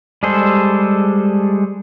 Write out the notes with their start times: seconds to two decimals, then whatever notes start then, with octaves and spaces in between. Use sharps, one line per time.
0.23 G3 G#3 G#4 A4 C5